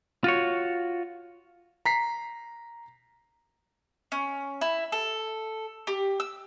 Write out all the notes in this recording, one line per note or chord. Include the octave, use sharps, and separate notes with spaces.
F4 F#4 C#5
A#5 B6 C7
C#4
E4
A4
G4
E6